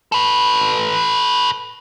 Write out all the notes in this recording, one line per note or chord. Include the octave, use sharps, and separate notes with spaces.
A4 B4